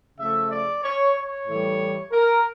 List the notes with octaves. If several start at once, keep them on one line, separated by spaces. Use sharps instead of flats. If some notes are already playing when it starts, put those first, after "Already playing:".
C#3 F3 A3 E5
D5
C#5
C#5
A2 E3 G3
A#4